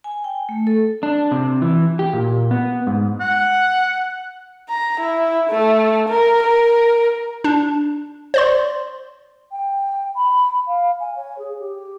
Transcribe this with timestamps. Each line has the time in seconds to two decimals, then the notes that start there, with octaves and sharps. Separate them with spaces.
0.04 G#5
0.24 G5
0.49 A3
0.67 A4
1.03 D4
1.32 C3
1.62 E3
1.99 G4
2.13 A#2
2.51 B3
2.87 G#2
3.20 F#5
4.70 A#5
5.00 E4
5.50 A3
6.09 A#4
6.43 A#4
7.44 D4
8.34 C5 D5 C6
9.51 G5
10.15 B5
10.67 F5
11.00 G#5
11.15 C#5
11.38 G#4
11.59 G4